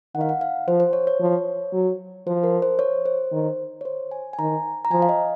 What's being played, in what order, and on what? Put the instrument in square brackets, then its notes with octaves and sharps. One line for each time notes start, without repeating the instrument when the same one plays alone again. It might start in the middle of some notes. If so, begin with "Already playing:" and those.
[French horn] D#3 [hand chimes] F#5
[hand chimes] F5
F#5
F5
[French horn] F3 [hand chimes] C5
[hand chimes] C5
C#5
C#5
[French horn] F3
F#3
[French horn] F3 [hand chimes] C5
[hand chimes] A#4
C5
C#5
C5
[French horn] D#3
[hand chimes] C#5
C5
G#5
G#5
[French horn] D#3 [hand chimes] A#5
[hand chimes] A#5
[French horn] F3 [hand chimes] G#5
[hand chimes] F5
D#5